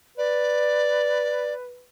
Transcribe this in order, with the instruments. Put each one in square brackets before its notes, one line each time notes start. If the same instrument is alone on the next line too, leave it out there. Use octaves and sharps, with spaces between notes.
[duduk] B4 [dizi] D5